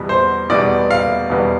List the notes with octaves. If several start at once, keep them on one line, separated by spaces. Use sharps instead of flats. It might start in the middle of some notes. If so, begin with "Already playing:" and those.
Already playing: E2 B2 G3 B3
C5
E2 B2 G3 B3 D5
F5
E2 B2 G3 B3